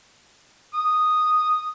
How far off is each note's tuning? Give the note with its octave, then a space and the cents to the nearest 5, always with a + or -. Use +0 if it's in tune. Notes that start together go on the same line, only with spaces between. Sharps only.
D#6 -5